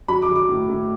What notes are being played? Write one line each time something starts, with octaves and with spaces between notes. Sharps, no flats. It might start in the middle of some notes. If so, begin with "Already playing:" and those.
F#3 B5
D6
F#3
D6
A2
A2